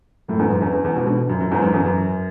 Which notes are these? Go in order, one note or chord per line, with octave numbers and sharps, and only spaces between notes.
F#2 A2
E2 G#2
F#2
E2
E2
E2
G#2 B2
B2 D3
F#2
F#2
E2 G#2
F#2
E2
F#2